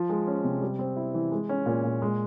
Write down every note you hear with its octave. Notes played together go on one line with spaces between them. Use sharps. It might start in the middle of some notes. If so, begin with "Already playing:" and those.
Already playing: F3
G#3
C#4
C3
G3
C4
E4
E3
G#3
C#4
A#2
A#2
G#3